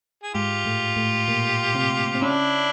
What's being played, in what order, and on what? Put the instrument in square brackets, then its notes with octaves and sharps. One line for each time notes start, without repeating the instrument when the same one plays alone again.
[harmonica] G#4
[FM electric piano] G#2 G#3 [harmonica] F4 G4
[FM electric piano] A2 A3
A2 A3
A#2 A#3
C3 C4
C4
[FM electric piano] C#3 C#4 [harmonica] D4 E4